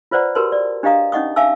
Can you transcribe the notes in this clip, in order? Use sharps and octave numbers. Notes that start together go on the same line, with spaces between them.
F4 B4 C5 D5 F#5 A#5
F#4 G4 A#4 B4 A5 C6
D5
D4 G4 D#5 F5 A#5 D#6
C#4 D#4 D#5 F#5 C#6 D#6
E5 F5 G#5 A5 D6 E6